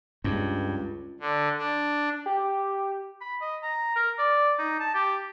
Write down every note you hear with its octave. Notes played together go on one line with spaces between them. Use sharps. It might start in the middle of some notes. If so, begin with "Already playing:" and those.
C#2 G2
D3
D4
G4
B5
D#5
A#5
A#4
D5
D#4
A5
G4